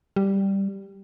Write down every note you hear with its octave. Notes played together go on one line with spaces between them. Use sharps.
G3